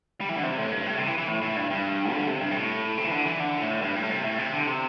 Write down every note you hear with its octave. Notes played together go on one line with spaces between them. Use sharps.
G3
E3
D3
C3
A2
G2
A2
C3
E3
E3
A2
A2
G2
G2
D3
C3
G2
C3
A2
C3
E3
D3
E3
D3
A2
G2
A2
C3
A2
C3
D3
C3